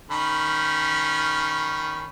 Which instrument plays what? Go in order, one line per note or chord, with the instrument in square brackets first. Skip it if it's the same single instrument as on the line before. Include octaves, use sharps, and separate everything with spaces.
[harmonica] D#3 C#4 B5